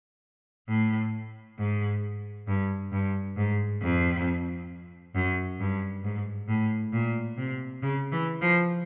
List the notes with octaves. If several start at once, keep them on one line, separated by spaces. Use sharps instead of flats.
A2
G#2
G2
G2
G#2
F2
F#2
G2
G#2
A2
A#2
C3
C#3
E3
F3